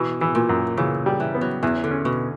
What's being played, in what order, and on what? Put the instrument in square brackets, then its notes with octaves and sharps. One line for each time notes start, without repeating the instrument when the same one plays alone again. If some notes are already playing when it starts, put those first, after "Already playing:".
Already playing: [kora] B2 [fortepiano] E3
[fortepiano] E3
[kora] A#2
[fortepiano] F#2
[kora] C#3 [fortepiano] E3
[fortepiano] G3
[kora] E3
[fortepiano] B3
[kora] F#3
[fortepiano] E2 [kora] E3
[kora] D3
[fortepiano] C#4
[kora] B2